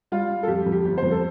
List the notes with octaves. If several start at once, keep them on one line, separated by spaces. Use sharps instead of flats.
G3 F4
G3
A4
F2 G4
F2
G4
G1
C5
F2
A4